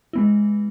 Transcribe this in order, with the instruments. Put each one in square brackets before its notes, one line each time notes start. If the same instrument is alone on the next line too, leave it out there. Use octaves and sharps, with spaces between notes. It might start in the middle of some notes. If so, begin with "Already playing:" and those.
[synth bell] G#3 B3 E4